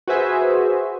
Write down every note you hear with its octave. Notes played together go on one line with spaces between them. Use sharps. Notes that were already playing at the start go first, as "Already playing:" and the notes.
F#4 G#4 B4 C5 E5 G#5